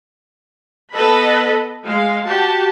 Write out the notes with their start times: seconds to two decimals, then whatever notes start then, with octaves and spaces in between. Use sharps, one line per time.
0.92 B3 A4 B4 D#5 B5
1.83 G#3 F5
2.24 F#4 G4 A5